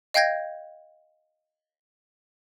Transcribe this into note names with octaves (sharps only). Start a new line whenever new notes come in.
D#5 F5 G5 G6 G#6 A#6